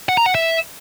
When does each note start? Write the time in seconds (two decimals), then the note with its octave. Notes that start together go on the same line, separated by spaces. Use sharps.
0.09 F#5
0.17 A#5
0.26 F#5
0.35 E5